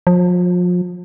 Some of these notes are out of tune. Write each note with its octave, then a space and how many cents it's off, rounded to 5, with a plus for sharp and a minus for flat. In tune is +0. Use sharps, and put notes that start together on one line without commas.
F3 +35